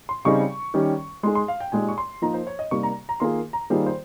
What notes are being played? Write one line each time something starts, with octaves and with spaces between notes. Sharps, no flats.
C6
C#3 G3 C4 D#4 G#4 C#6
D#3 G3 C#4 G4
G#3 D#4 G#4 C6
C6
F5
G5
A#2 G#3 D#4 G4 G#5
C#6
C6
F3 A#3 D#4 A#5
C5
C#5
D#5
C3 G3 A#3 D#4 C#6
A#5
A#5
D#3 A#3 F4 G#4 C6
A#5
D#3 G3 A#3 F4 G#4 C5
C5